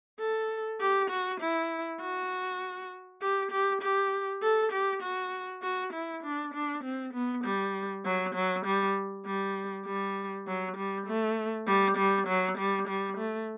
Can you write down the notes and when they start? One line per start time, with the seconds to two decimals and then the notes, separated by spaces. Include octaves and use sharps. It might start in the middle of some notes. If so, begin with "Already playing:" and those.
0.19 A4
0.80 G4
1.10 F#4
1.41 E4
2.01 F#4
3.21 G4
3.51 G4
3.82 G4
4.42 A4
4.72 G4
5.03 F#4
5.62 F#4
5.93 E4
6.23 D4
6.54 D4
6.84 C4
7.13 B3
7.44 G3
8.05 F#3
8.35 F#3
8.65 G3
9.26 G3
9.86 G3
10.47 F#3
10.77 G3
11.07 A3
11.67 G3
11.97 G3
12.27 F#3
12.58 G3
12.88 G3
13.18 A3